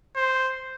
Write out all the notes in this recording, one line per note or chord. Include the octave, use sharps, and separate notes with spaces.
C5